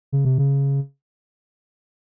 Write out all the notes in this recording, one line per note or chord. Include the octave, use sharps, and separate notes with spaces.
C#3
C3
C#3